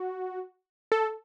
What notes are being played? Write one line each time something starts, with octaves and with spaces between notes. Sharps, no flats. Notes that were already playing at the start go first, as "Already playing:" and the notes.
Already playing: F#4
A4